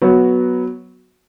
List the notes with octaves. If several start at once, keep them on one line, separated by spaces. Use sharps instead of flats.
F#3 B3 F#4